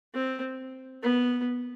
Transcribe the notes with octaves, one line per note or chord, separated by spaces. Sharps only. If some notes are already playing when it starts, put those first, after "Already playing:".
C4
B3